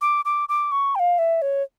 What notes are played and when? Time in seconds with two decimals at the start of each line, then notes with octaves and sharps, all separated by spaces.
0.01 D6
0.25 D6
0.49 D6
0.72 C#6
0.95 G5
0.99 F5
1.19 E5
1.42 C#5